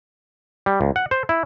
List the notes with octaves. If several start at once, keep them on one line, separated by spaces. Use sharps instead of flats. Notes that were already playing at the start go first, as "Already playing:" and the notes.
G3
C#2
F#5
C5
E4